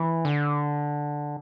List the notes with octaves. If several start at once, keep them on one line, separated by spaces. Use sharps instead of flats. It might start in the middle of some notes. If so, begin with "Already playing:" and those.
Already playing: E3
D3